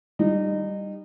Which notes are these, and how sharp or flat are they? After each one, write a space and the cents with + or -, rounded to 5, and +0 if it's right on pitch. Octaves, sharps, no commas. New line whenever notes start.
G3 +0 D#4 -25